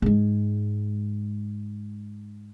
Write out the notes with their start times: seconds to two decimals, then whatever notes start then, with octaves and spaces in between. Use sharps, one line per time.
0.02 G#2 G#3